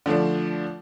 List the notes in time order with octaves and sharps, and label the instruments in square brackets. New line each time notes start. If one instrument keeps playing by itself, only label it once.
[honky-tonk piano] D3 F3 A3 D4